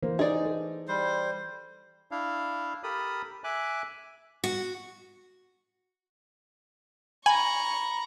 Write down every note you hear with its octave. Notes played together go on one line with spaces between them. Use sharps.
E3 A#3 C5
D#4 G#4 D5
A4
G3 C5
D4 E4 F5
G4 A4 A#4 B5 D#6
E5 G#5 D6 F#6
F#4
G#5 A#5 B5 C#6 F#7